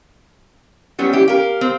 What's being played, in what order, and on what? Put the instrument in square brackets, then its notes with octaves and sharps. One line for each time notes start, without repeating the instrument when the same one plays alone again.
[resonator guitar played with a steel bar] F#3 G3 B3 [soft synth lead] C#4
[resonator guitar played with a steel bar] E4 G4
[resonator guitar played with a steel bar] G4 A#4 [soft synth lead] F5
[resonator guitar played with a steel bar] C4